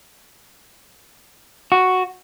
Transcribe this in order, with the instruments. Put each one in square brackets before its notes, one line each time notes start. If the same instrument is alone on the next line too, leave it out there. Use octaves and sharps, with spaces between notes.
[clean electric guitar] F#4